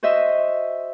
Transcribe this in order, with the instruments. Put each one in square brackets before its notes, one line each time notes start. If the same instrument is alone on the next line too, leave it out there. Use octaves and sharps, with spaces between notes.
[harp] F#4 C5 D#5 E5